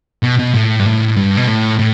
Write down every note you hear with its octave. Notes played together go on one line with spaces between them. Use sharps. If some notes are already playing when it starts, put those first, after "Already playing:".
B2
B2
A2
G2
A2
G2
B2
A2
A2